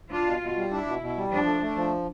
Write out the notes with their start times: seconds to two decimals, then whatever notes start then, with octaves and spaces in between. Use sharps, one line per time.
0.11 D4 F4
0.26 B2
0.41 B2
0.56 G3
0.71 D4 E4
0.86 B2
1.01 B2
1.17 G3
1.31 F3 D4
1.46 A3
1.61 A3
1.76 F3